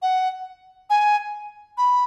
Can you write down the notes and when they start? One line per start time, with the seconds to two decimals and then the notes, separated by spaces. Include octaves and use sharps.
0.02 F#5
0.90 G#5
1.78 B5